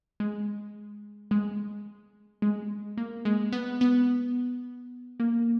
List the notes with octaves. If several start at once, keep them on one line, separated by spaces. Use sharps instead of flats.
G#3
G#3
G#3
A#3
G#3
B3
B3
A#3